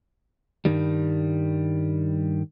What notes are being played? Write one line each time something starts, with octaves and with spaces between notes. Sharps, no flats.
G2 D#3 G3